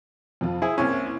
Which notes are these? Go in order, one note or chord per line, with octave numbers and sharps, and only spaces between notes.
F2 F3 F4
E4 G#4 C5
C2 A#3 C4 C#4 E4